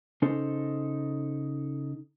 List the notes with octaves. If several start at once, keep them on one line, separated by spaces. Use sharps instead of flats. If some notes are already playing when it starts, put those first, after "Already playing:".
C#3 C#4 D#4 A4 C5